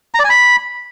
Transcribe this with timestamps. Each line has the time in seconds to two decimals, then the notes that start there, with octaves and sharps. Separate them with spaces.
0.14 A#5
0.19 D5
0.24 G#5
0.29 B5